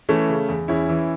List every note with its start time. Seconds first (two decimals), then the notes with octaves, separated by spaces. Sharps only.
0.09 E3 A3 C#4
0.29 C#3
0.49 E2
0.68 E2 C#4 E4
0.89 E3